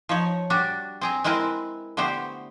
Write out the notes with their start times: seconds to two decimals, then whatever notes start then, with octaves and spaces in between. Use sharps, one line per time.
0.09 F3 D#4 C#5
0.50 G3 D4 F#4
1.01 C4 G#4 A#5
1.24 G#3 C4 E4 A#4 B4
1.97 D3 A3 B3 G4 C5